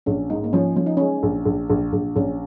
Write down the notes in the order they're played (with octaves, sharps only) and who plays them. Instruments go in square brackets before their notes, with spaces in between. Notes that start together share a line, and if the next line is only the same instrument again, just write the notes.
[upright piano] A#1 [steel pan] C#4
[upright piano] G#2 [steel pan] D#4
[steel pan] A#3
[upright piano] F3 [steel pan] C#4
[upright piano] F3 [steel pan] C#4
[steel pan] D#4
[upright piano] G#3 [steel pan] C#4
[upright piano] A#1
A#1
A#1
A#1
[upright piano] A#1 [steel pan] C#4